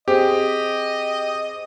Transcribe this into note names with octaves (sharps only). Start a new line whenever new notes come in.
C4 G4 G#4 D#5